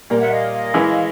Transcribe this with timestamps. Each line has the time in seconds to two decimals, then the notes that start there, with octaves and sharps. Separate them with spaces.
0.10 A#2 G3 A#3
0.21 E5 F#5
0.31 D#5 F5
0.74 E3 G#3 C#4 E4